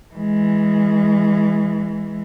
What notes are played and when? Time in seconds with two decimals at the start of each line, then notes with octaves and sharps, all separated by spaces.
0.15 E3 G#3